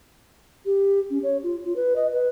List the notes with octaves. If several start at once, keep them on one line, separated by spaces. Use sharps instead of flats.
G4
C#4
C#5
F4
F4
B4
D#5
B4